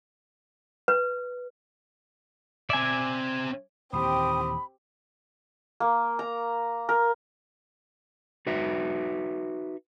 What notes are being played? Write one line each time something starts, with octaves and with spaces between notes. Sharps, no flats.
B4
C4 D5 E5 G#5
D#2 A#2 E3 C4 G4 B5 D#6
A#3
A#5
A#4
D#4 F#4 B4 E5